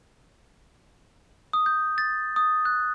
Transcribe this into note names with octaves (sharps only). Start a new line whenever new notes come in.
D#6
G6
A6
D#6
F#6